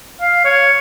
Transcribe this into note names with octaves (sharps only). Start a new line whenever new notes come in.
F5
C#5